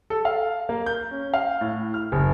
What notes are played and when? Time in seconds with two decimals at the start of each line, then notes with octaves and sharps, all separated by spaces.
0.10 A4
0.25 F5
0.69 A#3
0.86 G6
1.11 C#4
1.34 F5
1.61 A2
1.94 F6
2.12 F#1